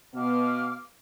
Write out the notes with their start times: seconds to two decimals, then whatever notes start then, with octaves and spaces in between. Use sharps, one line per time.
0.14 B2 B3 F5 D6 F6